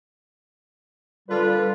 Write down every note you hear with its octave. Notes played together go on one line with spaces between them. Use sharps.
A#2 D3 G3 F4 B4